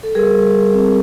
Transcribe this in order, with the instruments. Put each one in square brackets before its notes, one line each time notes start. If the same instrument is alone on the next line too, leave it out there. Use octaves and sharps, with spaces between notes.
[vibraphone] A4
G3 G#4 A#4
G3
G3
C4